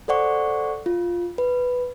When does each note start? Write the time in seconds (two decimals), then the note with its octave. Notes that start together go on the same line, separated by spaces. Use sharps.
0.08 A4 C5 D5 F#5 C#6
0.86 F4
1.38 B4